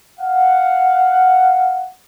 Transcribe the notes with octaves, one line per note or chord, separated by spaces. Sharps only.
F5 F#5